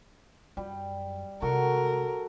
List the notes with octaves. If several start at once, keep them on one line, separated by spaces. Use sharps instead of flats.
F#2 G3
C3 G#3 F#4 A4 A#4